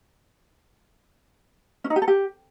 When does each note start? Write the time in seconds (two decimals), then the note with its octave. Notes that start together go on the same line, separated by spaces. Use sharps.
1.84 C#4
1.90 D#4
1.96 G4
2.02 A4
2.08 G4